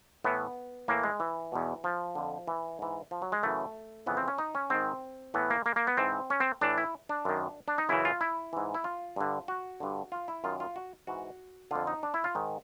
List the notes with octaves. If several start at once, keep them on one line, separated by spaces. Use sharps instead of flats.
A2 E3 B3
A2 E3 A#3
G#3
E3
E2 B2
F3
F2 D3
E3
G#2 E3
F3
F#3
G#3
F#2 C#3 E3 A3
F2 C#3 E3 B3
C4
C#4
D#4
C#4
G#2 D#3 C4
A2 E3 B3
A#3
A#3
A#3
B3
G#2 E3 C4
C#4
C4
A2 E3 D4
E4
D4
F#2 D#3
D4
D#4
F#2 C#3 E3 E4
F4
E4
G#2 E3
E4
F4
G2 D3
F#4
G2 D3
F4
E4
F#2 D#3 F4
F4
F#4
G#2 E3 F#4
F2 D3 F4
D#4
D4
E4
F4
G#2 D#3